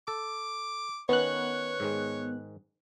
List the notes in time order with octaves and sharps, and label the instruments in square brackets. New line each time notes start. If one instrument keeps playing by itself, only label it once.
[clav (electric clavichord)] A4 [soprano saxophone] D6
[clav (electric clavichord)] D#3 C#4 [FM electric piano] B3 F#6 [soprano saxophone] C#5
[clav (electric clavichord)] G#2 D#3 G#3